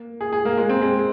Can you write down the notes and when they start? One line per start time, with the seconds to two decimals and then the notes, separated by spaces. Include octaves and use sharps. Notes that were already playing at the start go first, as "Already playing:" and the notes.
Already playing: A#3
0.21 G#4
0.33 G#4
0.45 A#3
0.57 G#3
0.70 C4
0.81 G#3